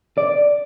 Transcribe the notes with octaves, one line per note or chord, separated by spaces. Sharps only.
D5